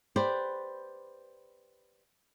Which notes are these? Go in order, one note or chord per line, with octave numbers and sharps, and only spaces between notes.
G4 B4 C5 D5